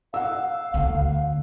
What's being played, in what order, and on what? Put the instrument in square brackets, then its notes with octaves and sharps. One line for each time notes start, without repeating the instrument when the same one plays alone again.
[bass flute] F5 [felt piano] F#5 E6
[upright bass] D2 D3